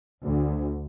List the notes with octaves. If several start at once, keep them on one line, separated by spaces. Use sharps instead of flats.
D2